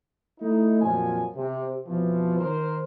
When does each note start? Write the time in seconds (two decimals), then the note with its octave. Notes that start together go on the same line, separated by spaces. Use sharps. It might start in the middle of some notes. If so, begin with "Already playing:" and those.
0.39 A3 D#4 E4
0.81 F2 A#2 F3 F#3 G#5
1.35 C3
1.87 F2 B2 E3 F3
2.38 D#3 A#4 C5